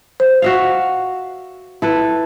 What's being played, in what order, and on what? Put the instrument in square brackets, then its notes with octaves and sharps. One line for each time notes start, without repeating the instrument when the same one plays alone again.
[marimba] C5
[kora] F#4 E5 F5
E4 A4 B4